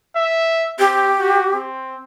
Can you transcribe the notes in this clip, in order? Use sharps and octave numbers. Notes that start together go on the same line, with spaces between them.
E5
C4 G4
F#4
C4